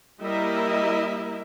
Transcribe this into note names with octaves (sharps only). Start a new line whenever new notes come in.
G3 A#3 E4 A#4 D#5 E5